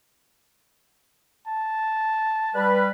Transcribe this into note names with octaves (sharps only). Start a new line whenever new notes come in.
A5
G3 B4